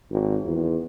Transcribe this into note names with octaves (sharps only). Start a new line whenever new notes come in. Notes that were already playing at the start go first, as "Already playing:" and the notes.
G#1
E2